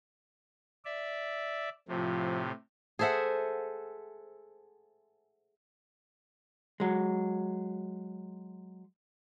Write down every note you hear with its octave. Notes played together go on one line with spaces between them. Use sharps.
D5 E5
A2 C3 F3
G#4 A4 C5 E5 F#5
F#3 G#3